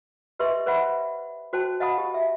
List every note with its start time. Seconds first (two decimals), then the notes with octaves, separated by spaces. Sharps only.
0.39 G4 B4 D#5 E5 C6 C#6
0.66 B4 C5 D5 E5 F#5 B5
1.53 F#4 C5 G5 A5
1.80 D#5 F5 F#5 A5 B5 D#6
1.98 G4
2.14 E5